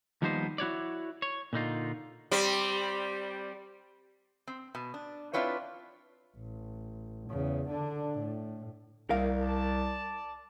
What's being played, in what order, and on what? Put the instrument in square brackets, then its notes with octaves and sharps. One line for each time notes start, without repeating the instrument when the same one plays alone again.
[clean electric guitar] D#2 F3 G3 B3 D#4 C5
E4 F#4 C#5 D5
C#5
A#2 D3 D#4 F4
[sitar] G3 C4
[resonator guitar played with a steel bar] C4
B2
D4
C4 D4 E4 F4 B4 C#5
[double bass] A1
E2 C#3
D3 D4
A2
[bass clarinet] C2 [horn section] D#3 A3 A#3 [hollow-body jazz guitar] A#4 F5
[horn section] D5 A5